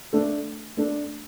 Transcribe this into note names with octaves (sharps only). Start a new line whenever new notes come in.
A3 D4 A4
A3 D4 A4